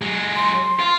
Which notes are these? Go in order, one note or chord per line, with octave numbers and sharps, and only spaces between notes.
F#3 G#3
C6
F4